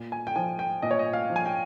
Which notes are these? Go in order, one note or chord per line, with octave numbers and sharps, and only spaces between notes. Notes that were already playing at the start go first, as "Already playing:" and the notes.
Already playing: A#2
G#5
G5
F3 G#5
G5
A#2 D#5
C#5
D#5
F5
F3
G#5
G5